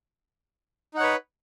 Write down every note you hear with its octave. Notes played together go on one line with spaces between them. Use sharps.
D#4 B4 C#5 F#5